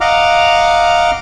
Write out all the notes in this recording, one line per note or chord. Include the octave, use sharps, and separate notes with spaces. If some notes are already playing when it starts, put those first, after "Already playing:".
D#5 F5 F#5 A#5 D6 F6